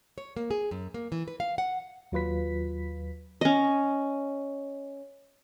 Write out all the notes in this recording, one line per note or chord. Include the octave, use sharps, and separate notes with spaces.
C#5
A#3
G#4
F#2
A#3
E3
B4
F5
F#5
D#2 F#3 F4 B4 B6
C#4 D#5